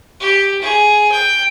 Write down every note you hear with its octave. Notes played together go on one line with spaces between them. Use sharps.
G4
G#4
G5